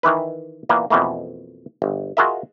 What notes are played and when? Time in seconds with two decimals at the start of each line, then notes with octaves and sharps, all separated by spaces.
0.03 D#3 E3 E4 B4
0.69 A#2 E3 A#3 B3
0.90 F2 B2 E3 A3 A#3
1.82 G1
2.17 F4 F#4 G#4 A#4 D#5 E5